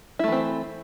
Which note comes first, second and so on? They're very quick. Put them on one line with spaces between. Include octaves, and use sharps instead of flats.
E4 A3 E3 C4